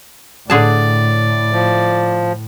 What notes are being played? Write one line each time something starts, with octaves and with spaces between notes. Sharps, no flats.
A2 D3 G#4 D5 A5
F3